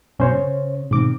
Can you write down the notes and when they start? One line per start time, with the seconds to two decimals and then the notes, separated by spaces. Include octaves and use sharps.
0.20 B1 G2 B2 C#4 C5 C#5
0.33 C#3
0.91 G#2 B2 D#3 C4 D6